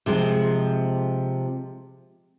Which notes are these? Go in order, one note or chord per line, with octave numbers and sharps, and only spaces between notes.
C3 F3 G#3 C4